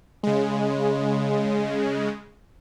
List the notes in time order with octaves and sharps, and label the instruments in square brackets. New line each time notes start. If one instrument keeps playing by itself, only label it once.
[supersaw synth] C#3 G#3